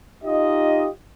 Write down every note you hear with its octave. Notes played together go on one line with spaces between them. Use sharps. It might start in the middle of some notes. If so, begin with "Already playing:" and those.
D#4 F4 G4 D#5